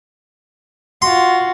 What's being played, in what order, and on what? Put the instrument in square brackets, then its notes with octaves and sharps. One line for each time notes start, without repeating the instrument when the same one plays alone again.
[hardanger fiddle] F4 F#4 [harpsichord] C6